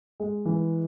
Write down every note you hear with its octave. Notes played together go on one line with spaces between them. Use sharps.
G#3
E3